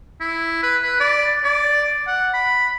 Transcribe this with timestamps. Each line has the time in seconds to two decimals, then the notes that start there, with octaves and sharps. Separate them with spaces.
0.20 E4
0.63 B4
0.82 B4
1.00 D5
1.44 D5
2.07 F#5
2.34 B5